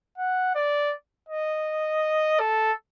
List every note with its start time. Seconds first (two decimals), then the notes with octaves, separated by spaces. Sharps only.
0.18 F#5
0.55 D5
1.29 D#5
2.40 A4